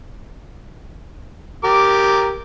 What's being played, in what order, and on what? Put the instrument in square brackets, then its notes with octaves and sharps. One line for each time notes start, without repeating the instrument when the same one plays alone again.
[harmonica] G4 A#4 [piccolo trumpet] D6